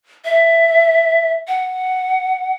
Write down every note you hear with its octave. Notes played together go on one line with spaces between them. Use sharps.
E5
F#5